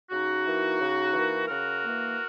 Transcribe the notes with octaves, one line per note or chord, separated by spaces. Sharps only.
C#3 D#4 F#4
E3 A#3
C#3
E3 A#3
C#3 F#4 A#4
E3 A#3